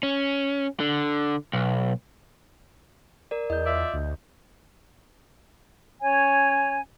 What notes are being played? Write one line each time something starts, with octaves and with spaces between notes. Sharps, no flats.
C#4
D3
B1
A#4 D5
E2 D#5 G6
F4 D5 E5
D2
C#4 C#5 G#5